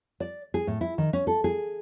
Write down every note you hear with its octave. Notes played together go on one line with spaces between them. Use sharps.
D5
G#4
A2
E4
D#3
C#4
A4
G#4